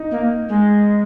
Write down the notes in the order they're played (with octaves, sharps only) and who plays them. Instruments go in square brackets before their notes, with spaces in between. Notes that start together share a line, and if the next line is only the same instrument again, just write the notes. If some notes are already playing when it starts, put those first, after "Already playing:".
Already playing: [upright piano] D#4
[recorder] A#3
G#3